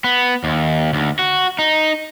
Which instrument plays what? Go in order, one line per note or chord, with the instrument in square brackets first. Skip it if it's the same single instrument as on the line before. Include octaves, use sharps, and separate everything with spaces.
[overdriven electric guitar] B3
D#2
D2
F#4
D#4